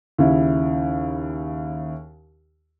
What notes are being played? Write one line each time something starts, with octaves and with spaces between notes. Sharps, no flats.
D#2 C#3 E4